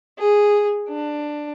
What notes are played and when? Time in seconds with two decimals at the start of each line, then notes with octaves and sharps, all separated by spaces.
0.18 G#4
0.88 D4